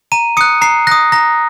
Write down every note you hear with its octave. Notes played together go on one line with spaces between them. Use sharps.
A#5 D#7
D#6 F#6 C#7
A#5 C7
D#6 F#6 A#6
A#5 A#6